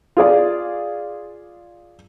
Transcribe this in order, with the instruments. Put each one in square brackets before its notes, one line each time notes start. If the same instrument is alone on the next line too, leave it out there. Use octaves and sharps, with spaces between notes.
[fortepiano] F4 G#4 D5